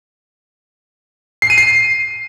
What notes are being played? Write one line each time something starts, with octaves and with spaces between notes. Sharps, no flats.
C7
D#7
C7